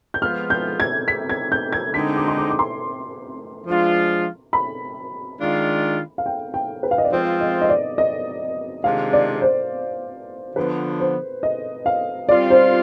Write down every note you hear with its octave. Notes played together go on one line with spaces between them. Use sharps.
G6
F3 G#3 B3 F4 F6
G6
G#6
B6
G#6
G6
G#6
D3 G#3 C4 D#4 B6
D6
C6
D6
D6
C6
F3 G#3 D4 F4
B5
D#3 G#3 D4 F4
F5
G5
G5
B4
F5
D#5
D5
F3 G#3 C4 F4 C5
D#5
D#5
D5
D#5
C3 D#3 G#3 D4 F4 F5
D5
C5
D3 F3 B3 B4
C5
D#5
F5
G3 C4 F4 D5
C5